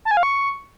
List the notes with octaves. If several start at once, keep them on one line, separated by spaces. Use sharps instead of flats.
A5
G#5
F5
C#6